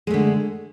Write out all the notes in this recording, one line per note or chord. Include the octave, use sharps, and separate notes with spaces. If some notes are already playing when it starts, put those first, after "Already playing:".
D3 G#3 A3